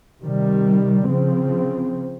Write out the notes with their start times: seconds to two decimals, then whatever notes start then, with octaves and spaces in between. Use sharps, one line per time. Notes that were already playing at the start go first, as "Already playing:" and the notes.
0.21 C3 D#3 G3
1.06 C#3 F3 C4